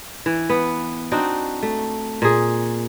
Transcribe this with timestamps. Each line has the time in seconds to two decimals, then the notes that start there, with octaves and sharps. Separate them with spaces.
0.26 E3
0.49 B3
1.12 C4 D4 D#4 F#4
1.63 A3
2.22 A#2 G#4